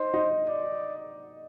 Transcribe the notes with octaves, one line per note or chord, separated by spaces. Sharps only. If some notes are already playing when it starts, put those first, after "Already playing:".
Already playing: D#4 C5
D#4
D5